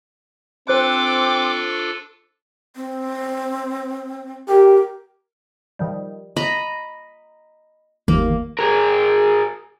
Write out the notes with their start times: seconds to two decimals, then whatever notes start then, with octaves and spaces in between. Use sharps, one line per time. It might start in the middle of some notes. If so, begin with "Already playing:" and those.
0.68 C4 D4 F4 A4 C5 D6 F#6
2.76 C4
4.49 G4 A#4
5.79 D#3 F3 G3
6.36 D#5 A#5 B5
8.08 G1 D#2 D#3 A#3
8.59 G#4 A#4